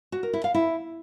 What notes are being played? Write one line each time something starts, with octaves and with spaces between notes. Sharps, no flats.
F#4
A#4
E4
F5
E4